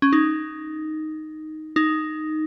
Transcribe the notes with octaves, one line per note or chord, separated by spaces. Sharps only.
C#4
D#4
D#4